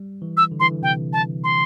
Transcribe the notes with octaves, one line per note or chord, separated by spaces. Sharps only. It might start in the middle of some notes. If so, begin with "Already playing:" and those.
Already playing: G3
E3
E6
D3
E3 C6
D3
C3 G5
A5
C6